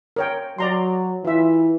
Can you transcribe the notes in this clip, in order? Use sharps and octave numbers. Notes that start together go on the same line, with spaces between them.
A#4 C#5 G5
F#3 D5 A#5 C6
E3 F4 E5